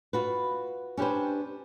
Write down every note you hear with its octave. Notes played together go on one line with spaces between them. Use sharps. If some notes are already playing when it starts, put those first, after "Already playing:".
F4 F#4 B4
C#4 D4 G4 B4 C5